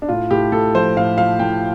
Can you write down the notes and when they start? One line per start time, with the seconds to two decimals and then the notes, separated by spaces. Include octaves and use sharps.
0.02 D4
0.09 A2 F4
0.31 A2 G4
0.52 A2 A4
0.75 F3 C5
0.97 A2 F5
1.18 F3 F5
1.40 A2 G5